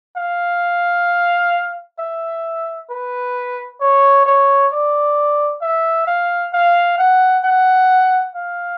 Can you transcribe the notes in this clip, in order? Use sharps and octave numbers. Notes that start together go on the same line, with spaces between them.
F5
E5
B4
C#5
C#5
D5
E5
F5
F5
F#5
F#5
F5